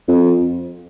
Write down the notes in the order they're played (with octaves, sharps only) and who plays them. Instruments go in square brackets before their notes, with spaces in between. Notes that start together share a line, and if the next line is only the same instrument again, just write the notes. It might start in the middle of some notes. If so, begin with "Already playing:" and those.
[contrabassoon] F2